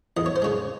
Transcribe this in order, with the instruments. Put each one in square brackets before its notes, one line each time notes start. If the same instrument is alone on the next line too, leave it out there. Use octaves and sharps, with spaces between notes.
[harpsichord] E2 D#5
C#5
C5
C#3 G#3 C#5